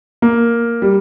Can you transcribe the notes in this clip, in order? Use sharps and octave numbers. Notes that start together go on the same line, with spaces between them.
A#3
G3